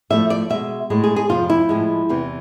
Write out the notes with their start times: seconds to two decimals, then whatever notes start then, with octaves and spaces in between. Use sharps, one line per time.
0.10 A2 F3 A3 E5
0.30 D5
0.50 B2 G#3 E5
0.90 A2 G#3
1.04 G#4
1.16 G#4
1.29 F2 C3 F3 F4
1.50 E4
1.69 A2 F3 G#3
2.09 E2 C3 E3